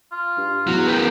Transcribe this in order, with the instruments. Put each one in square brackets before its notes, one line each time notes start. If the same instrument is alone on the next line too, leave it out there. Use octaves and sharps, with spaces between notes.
[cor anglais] F4
[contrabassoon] G2
[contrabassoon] E2 [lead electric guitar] F#3
[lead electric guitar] B3 A#4 [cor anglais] G5